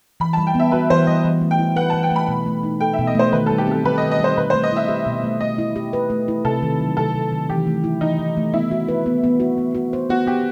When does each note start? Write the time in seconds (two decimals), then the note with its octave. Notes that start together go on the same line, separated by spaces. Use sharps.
0.20 E3 B5
0.33 G3 A5
0.47 G5
0.55 B3 E5
0.72 F#4 B4
0.90 E3 C5
1.07 G3 D#5
1.24 E3
1.42 A3
1.51 G5
1.59 E4
1.76 B4 F#5
1.90 E3 A5
2.03 G5
2.11 A3 B5
2.28 B2
2.46 A3
2.63 D#4
2.81 A4 G5
2.93 E5
2.99 B2
3.07 D#5
3.15 A3 C5
3.33 D#3 B4
3.46 G3 A4
3.58 G4
3.67 C4 A4
3.85 D#3 B4
3.98 D#5
4.02 D#3
4.11 D#5
4.19 G3 C5
4.37 B2 B4
4.50 A3 C5
4.64 D#5
4.72 E4 E5
4.88 G4
5.06 B2
5.24 A3
5.40 A3 D#5
5.58 E4
5.76 G4
5.93 B4
6.10 A3
6.28 E4
6.45 C3 A4
6.62 D#3
6.80 F#3
6.97 C3 A4
7.14 C3
7.32 D#3
7.50 E3 G4
7.67 A3
7.84 E4
8.01 E3 D#4
8.19 E3
8.37 A3
8.53 B3 E4
8.71 F#4
8.88 B4
9.06 B3
9.24 B3
9.40 F#4
9.58 B3
9.75 F#4
9.93 C5
10.09 B3 F#4
10.27 B3 G4